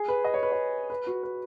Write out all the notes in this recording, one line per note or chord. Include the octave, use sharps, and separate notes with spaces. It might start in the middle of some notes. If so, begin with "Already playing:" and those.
Already playing: G#4
B4
D#5
C#5
B4
C#5
B4
F#4
B4